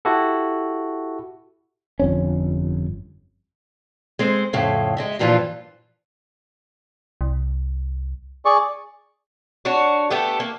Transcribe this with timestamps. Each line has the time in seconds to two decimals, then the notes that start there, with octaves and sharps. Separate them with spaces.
0.05 E4 F#4 G4 A4
1.99 G1 F2 C#4
4.19 G#3 C4 C5
4.53 F2 A2 C#3
4.97 G#3 D#5 E5
5.19 G2 A#2 E3 F3 F4
7.21 C2
8.45 G#4 D5 C#6
9.65 D4 F#4 C#5
10.11 A3 B3 G4 A4
10.40 A#3